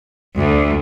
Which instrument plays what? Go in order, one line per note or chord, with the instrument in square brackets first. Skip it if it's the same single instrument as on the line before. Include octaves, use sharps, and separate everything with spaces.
[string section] D2